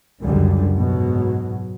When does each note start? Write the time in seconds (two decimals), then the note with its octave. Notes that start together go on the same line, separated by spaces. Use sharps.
0.24 C#2 F#2 D3 G3
0.76 G#2 B2 F#3